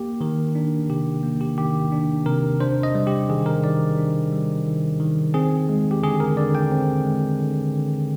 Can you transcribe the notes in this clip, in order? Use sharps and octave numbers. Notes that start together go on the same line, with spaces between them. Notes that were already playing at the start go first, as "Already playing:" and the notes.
Already playing: A#3 G4
D#3 A#4
D4
C3 G4
A#3
G4
D#3 G4
D4
C3 A#4
D4 C5
D#5
G3
G4
D#3 G#4
A#4
D#3 D5
D4
G3
D#3
D#3
C4 G#4
G#3
G4
D3 G#4
A#4
D3 D5
G5
C4
G#3
D3
D3